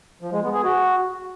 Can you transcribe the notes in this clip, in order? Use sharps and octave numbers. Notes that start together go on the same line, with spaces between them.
F3
G#3
B3
G#4
F#4